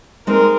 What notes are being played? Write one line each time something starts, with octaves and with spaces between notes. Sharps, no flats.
G#3 C4 D#4 A#4